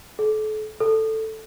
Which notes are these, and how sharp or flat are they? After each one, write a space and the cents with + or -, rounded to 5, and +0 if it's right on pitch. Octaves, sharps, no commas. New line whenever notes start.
A4 -35
A4 +5